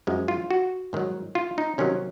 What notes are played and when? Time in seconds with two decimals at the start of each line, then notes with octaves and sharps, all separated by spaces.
0.07 F#2 F3 G#3
0.28 F4
0.51 F#4
0.93 G#2 D#3 F#3
1.35 F4
1.58 D#4
1.78 C3 D#3 F#3 C#4